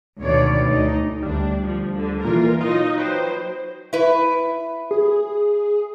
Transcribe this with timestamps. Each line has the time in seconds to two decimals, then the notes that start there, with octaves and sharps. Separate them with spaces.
0.20 D2 B2 D#3 C#5 D5
0.69 D2 D#4
1.23 D2 G3 D4
1.64 F3
1.94 D3
2.24 A#2 E3 F4 A#4
2.61 F#3 D#4 F4 D#5
2.98 F#3 B4 C5 G5
3.93 E4 B4
4.91 G#4